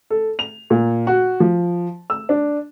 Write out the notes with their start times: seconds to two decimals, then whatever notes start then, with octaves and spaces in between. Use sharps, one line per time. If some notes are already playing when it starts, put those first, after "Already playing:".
0.10 A4
0.39 F7
0.70 A#2
1.07 F#4
1.40 F3
2.10 E6
2.29 D4